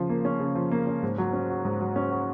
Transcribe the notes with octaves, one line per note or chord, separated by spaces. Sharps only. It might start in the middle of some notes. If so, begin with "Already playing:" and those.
Already playing: C#3 F3
A#3
C#4
C#3
F3
A#3
C#4
G#2
F#3
C#4
F#4
G#2
F#3
C#4
F#4